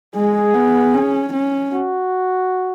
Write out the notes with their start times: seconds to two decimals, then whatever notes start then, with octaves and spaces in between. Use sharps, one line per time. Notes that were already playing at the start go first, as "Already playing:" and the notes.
0.15 G#3 G#4
0.54 B3
0.93 C#4
1.33 C#4
1.72 F#4